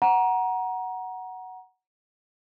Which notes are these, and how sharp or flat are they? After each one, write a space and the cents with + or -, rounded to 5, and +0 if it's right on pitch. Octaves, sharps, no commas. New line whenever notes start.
F#5 +5 A#5 +20